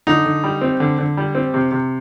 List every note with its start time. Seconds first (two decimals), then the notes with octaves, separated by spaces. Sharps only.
0.07 D3 D#4
0.25 D3
0.44 G3
0.61 C4
0.80 D3
0.99 D3
1.17 G3
1.35 C4
1.54 C3
1.72 C3